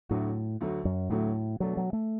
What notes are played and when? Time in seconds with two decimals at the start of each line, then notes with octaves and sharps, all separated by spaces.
0.09 D2 A2 D3 F#3 A3 F#4
0.61 D2 D3 F#3 A3 F#4
0.85 F#2
1.10 D2 A2 D3 F#3 A3 F#4
1.60 B2 F#3 A3 D4 F#4
1.77 F#3
1.93 A3